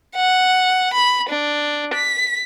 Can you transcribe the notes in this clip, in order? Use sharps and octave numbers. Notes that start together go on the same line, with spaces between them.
F#5
B5
D4
B6